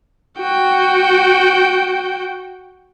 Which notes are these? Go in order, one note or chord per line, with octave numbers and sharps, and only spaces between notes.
F#4 G5